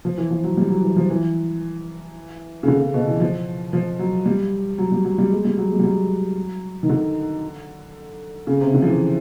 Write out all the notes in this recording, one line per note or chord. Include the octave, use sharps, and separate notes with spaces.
F3
E3
F3
F#3
G3
F#3
E3
F3
E3
C#3
D3
C#3
B2
E3
F3
F3
F#3
G3
F#3
G3
F#3
G3
G#3
G3
F#3
G#3
G3
F#3
D#3
D3
C#3
C3
D3
F3
E3